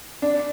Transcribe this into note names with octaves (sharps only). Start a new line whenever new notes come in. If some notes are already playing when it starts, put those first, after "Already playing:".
D4